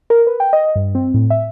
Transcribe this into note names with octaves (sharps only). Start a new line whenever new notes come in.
A#4
B4
G5
D#5
G2
C4
A2
E5